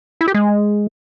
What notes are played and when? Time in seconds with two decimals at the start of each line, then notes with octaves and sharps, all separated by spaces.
0.21 E4
0.28 G4
0.34 G#3